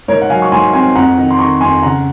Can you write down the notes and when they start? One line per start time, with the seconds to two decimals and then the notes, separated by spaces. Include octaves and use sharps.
0.08 G#2 A#4 C#5
0.22 F#5
0.30 F#3 F5 G#5
0.42 C#6
0.52 G#2 G#5 C6
0.73 C4 G#5 C6
0.95 F2 F#5 A#5
1.17 D#3
1.31 C6
1.39 D#3 A#5 C#6
1.60 F2 G#5 C6
1.83 C#3 F#5 A#5